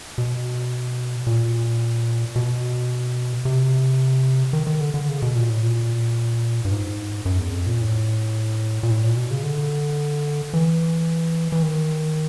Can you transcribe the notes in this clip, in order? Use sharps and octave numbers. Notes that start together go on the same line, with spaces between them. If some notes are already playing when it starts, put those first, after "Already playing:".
B2
A#2
B2
C3
D#3
D#3
D3
D3
C#3
B2
A#2
A2
A#2
G2
G#2
F#2
E2
F2
A#2
A2
A#2
A2
A#2
B2
C#3
D3
E3
E3
D#3